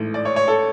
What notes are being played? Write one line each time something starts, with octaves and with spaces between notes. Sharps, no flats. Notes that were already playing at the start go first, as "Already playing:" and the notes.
Already playing: A1 G#2 E3 A3
D5
C#5
C#5
A4